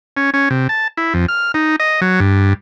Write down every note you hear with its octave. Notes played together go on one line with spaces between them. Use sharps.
C#4
C#4
C3
A5
E4
F2
F6
D#4
D#5
F#3
G2